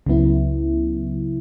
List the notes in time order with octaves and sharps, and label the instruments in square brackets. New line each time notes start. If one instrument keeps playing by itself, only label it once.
[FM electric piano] C#2 C#3 F#3 B3 E4